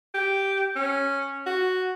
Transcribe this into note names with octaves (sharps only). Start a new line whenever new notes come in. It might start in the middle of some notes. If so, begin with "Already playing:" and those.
G4
C#4
F#4